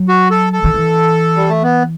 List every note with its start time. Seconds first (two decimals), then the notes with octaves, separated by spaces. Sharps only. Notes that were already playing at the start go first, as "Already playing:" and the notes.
Already playing: F#3
0.09 F#4
0.30 A4
0.53 A4
0.64 D#3
0.74 E3
1.36 G3
1.49 A3
1.63 B3